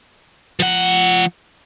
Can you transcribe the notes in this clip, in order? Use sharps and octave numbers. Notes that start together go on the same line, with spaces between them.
F3 F#5